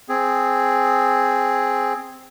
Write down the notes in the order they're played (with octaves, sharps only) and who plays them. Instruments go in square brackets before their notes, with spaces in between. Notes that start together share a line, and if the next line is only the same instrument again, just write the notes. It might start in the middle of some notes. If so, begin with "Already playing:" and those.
[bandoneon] C4 G#4